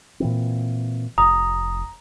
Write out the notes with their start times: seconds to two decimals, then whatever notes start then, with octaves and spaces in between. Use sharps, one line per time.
0.20 A#2 E3 C4
1.18 F1 A#5 D#6